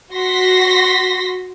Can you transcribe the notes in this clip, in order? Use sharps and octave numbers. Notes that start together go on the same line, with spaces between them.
F#4 C6 A#6 B6